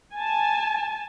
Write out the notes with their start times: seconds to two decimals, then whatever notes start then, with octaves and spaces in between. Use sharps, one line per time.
0.14 G#5 A5